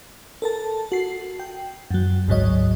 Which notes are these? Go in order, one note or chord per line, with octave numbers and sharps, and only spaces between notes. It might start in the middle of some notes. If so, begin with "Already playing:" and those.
A4 A#4 A5
F#4 C7
G5
F#2 F#3
G#1 D2 G#2 F#3 C#5 D#5